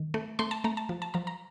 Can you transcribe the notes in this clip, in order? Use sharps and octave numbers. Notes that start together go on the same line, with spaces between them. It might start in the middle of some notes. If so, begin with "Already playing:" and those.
Already playing: D#3
A3
A3 C6
A5
A3 A#5
A5
F3
A5
F3 A#5
A#5